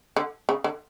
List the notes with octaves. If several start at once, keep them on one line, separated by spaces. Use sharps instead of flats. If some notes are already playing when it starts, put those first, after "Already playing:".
D3
C#3
D3